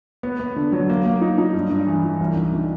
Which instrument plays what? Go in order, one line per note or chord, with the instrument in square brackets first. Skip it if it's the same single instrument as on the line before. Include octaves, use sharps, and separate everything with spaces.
[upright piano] B3
B3
D3
F#3
A#3
A#3
D#4
D#4
G2
G2
E3
E3
C2
D#3
D#3